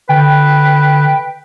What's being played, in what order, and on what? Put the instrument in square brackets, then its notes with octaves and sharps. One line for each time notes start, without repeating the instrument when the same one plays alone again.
[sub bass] D3 [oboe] B4 [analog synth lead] G5